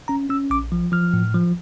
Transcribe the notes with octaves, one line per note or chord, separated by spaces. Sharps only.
C#4 A#5
C#4 E6
A#1 D6
F3
F3 F6
A2
F3